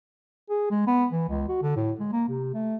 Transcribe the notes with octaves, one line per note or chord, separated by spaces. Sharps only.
G#4
G#3
B3
E3
C#2
F#4
D3
A2
G#3
A#3
C3
A3